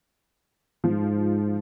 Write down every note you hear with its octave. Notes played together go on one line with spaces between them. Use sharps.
G#2 F3